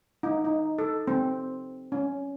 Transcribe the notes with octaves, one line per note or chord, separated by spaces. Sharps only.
D#4
D#4
A4
C4
C#4